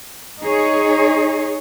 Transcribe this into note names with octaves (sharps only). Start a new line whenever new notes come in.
D#4 G#4 C#5